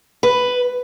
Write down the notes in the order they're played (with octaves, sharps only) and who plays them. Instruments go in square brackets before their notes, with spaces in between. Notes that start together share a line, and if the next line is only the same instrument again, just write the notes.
[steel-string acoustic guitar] B4